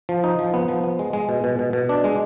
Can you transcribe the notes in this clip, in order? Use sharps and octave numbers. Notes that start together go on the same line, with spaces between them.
F3
D#4
F3
B3
F3
B3
G#3
G#3
B2
B2
B2
B2
D4
G#3